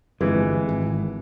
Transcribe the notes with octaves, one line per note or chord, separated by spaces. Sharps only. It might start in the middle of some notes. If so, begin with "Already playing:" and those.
G1 F2 E3 G#3
G#1